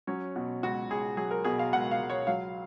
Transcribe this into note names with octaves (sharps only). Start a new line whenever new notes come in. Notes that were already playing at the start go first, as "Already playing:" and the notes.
F#3 C#4
B2
C#2 F#4
C#2 G#4
F#3 G#4
A#4
B2 G#4
F5
C#2 F#5
F5
C#2
C#5
F#3 F5